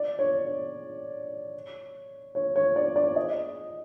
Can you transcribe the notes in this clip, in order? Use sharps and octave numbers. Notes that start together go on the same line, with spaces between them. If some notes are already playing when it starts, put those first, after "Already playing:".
Already playing: D5
C#5
C#5
C#5
C#5
D5
D5
D#5